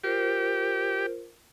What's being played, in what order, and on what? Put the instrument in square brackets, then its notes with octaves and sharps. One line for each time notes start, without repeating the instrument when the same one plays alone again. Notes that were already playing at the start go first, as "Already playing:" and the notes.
[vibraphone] F4 A#4 C5 [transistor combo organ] G4